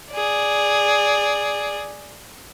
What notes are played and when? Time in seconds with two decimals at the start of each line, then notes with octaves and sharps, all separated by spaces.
0.11 G#4 D5